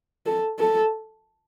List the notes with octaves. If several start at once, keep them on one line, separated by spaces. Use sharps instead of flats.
A4
A4